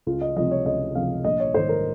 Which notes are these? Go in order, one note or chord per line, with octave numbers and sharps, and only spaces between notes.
C#2 F4
D#5
C3 F3 D#5
C#5
C#2 D#5
C3 F3 F5
A#1 D#5
C#5
G#2 D#3 C5
A#4